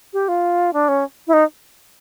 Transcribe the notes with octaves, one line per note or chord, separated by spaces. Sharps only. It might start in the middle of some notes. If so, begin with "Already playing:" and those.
G4
F4
D4
C#4
E4
D#4